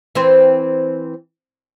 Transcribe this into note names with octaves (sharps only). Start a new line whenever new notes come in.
E3 C4 C5